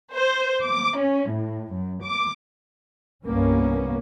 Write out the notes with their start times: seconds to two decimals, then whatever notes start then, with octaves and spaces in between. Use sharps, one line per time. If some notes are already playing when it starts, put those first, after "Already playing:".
0.13 C5
0.63 D6
0.96 C#4
1.29 A2
1.70 F#2
2.02 D6
3.25 C2 G2 A#3 B3 C#4